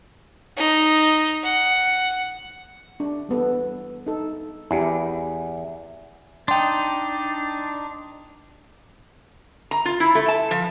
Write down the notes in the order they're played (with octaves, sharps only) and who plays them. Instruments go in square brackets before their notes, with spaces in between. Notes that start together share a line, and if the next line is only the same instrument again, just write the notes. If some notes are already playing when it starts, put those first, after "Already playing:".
[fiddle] D#4
F#5
[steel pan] D4
G3 B3 A4
D#4 A4
[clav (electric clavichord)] E2 [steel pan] E4 G4
[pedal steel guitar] D4 D#4 [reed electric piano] G5 C6
[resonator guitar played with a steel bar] A#5
F4
E4
A3
A5
F3